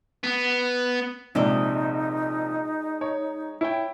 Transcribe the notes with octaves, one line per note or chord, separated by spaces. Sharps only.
B3
A#1 C3 G#3 D#4 D5 D#5
C#5
E4 C#5 G5